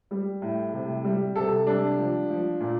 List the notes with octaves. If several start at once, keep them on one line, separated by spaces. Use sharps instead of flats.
G3
A2
C3
G3
C3 A4
G3 D4
F3
F3
A#2